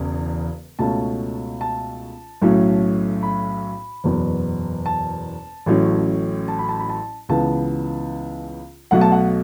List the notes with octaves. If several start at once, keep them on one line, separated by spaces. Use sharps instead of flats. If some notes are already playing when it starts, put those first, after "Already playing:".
Already playing: E1 E2 C#3
C#2 B2 A3 C#4 A5
A5
B1 A2 F#3 A3 C#4
B5
F#1 E2 B2 B3
A5
A1 A2 F#3 C#4
A5
B5
A5
B5
A5
C#2 C#3 E3 B3 A5
B1 B2 F#3 A3 F#5
A5
F#5